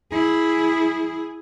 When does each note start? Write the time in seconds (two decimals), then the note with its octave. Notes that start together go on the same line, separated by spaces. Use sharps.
0.12 E4 G#4